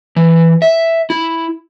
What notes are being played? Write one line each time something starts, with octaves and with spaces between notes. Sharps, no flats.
E3
E5
E4